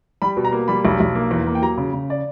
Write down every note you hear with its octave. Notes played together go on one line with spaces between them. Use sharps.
G3 B5
B2
A#5
A#3
G3 B5
B1
B1
A#3
E2
A#3
G5
F#3 A#5
C#3
C#3
D5